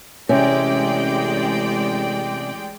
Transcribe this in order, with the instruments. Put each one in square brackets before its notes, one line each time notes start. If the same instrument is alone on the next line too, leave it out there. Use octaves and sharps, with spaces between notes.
[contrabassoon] A1 [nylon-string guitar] C3 [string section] G#3 D5 G5 [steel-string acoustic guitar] C#4